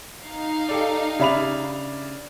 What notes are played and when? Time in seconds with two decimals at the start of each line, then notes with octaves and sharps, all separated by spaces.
0.21 D#4 F5
0.69 G4 A4 D5
1.19 C#3 D4 G4 E5 B5 F7